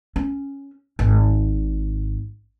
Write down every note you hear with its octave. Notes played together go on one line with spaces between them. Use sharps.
C#4
G#1